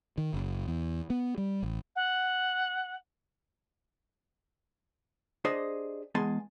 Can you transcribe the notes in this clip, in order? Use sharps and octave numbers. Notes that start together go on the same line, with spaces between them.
D#3
F#1
E2
B3
G3
A1
F#5
D4 G4 G#4 C5 D5 D#5
E2 G#3 B3 G#5 A5 C6